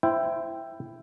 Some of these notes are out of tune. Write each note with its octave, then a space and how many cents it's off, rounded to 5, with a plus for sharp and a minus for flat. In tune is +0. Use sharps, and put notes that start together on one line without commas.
E4 +10 C5 -10 G5 +0